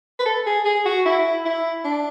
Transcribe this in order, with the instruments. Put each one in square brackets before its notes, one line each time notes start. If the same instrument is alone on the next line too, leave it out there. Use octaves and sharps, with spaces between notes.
[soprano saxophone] B4
A4
G#4
G#4
F#4
E4
E4
D4